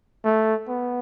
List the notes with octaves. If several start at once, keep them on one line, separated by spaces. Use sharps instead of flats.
A3
B3